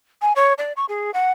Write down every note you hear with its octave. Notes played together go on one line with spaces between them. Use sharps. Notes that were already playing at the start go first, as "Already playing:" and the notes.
G#5
C#5
D5
C#6
G#4
F#5